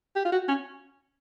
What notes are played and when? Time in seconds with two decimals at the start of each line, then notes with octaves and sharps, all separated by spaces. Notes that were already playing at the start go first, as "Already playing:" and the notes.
0.15 G4
0.25 F4
0.32 F#4
0.48 C#4